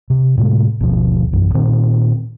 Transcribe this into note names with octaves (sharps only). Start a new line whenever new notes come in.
C3
A2 C3 G#3
G#1 D#2 B2 F3
A#1 F#2 E3
A#2 D#3 C4